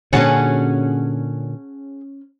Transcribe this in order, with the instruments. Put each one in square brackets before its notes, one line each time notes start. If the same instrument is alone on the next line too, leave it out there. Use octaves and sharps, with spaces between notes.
[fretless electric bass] A#2 D3 [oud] C#4 F#4 C#5 [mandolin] G#4 F#5 A5